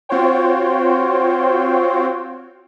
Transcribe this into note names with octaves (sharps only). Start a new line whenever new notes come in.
C4 F4 F#4 C5 C#5 G5